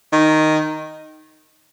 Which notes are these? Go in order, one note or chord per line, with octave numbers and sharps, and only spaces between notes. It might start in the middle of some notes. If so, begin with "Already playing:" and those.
D#3